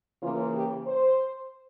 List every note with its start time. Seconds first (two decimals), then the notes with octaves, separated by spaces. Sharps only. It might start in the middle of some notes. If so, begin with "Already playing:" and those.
0.22 C#3 E3 A#3 F4
0.55 G4
0.87 C5